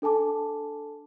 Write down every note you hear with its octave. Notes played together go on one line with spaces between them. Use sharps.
D4 A4 G#5 A5 D6